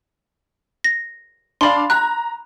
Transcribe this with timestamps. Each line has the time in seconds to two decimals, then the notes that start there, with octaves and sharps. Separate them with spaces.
0.84 A#6
1.61 D4 D5 F5 B5 C6
1.90 A#5 F#6